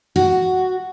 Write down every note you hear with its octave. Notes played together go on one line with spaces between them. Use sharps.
F#4